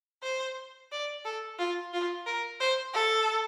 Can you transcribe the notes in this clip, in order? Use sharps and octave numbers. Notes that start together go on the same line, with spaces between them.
C5
D5
A4
F4
F4
A#4
C5
A4